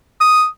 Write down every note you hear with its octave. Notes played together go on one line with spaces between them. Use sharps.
D#6